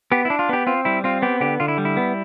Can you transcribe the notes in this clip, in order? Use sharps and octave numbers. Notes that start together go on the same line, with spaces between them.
B3 G4
E4
D4
F4
B3 G4
C4 F4
G3 E4
C4 F4
B3 G4
D3 G4
D3 F4
E4
G3
E4
B3